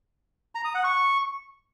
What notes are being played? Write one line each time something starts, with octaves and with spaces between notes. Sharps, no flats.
A#5
D#6
F#5
C#6